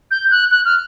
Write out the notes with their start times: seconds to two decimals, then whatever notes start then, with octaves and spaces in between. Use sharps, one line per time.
0.11 G6
0.31 F#6
0.51 F#6
0.65 F6